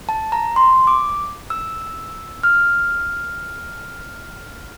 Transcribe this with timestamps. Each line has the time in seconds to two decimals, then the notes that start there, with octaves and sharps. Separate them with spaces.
0.09 A5
0.32 A#5
0.56 C6
0.87 D6
1.50 E6
2.43 F6